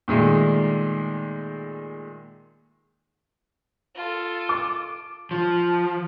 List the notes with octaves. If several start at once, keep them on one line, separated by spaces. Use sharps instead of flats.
A#2 D#3 G#3 A3
F4 A4
D6
F3